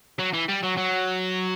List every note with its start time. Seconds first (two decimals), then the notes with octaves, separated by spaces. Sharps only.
0.19 F#3
0.33 E3
0.48 G3
0.63 F#3
0.77 F#3